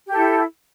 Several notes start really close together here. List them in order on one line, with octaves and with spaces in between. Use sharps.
G4 A4 E4